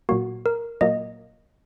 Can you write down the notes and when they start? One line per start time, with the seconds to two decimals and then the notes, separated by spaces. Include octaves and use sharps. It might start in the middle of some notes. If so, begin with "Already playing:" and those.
0.09 A#2 F#3 A#3 F#4
0.46 A#4
0.81 A#2 F#3 A#3 D#5